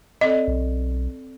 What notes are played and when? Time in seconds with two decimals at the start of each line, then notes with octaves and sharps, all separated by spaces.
0.21 C4 A4 D5 D#5
0.48 B1